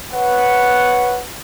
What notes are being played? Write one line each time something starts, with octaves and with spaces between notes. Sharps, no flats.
B4 C#5 F#5